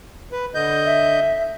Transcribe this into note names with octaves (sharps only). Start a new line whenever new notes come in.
B4
D3 D#5 G6
E5